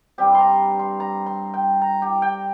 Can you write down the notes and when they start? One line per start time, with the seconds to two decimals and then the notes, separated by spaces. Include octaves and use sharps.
0.18 G2 G3 C4 G4
0.35 A#5 C6
0.79 C6
1.00 A#5
1.26 C6
1.54 G5
1.82 A#5
2.02 G4
2.22 G5